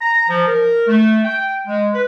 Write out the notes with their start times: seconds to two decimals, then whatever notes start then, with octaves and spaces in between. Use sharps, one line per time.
0.01 A#5
0.29 F3
0.47 A#4
0.87 A3
1.25 G5
1.67 G#3
1.93 B4